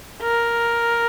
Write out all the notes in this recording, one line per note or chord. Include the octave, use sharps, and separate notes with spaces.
A#4